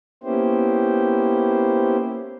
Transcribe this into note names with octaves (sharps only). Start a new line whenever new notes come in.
A#3 B3 C#4 E4 G4 C5